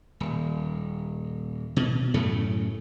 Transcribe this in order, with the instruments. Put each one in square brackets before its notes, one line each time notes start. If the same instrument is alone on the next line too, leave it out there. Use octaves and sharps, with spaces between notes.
[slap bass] D#1
B2
F#2 A2 C#3 A3